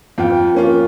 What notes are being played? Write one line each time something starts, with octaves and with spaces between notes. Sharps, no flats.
F2 F4 G5
A#3 C#4 F4